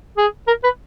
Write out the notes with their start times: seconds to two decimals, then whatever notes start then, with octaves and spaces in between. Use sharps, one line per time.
0.17 G#4
0.47 A#4
0.64 B4